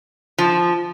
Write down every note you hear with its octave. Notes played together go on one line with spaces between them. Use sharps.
F3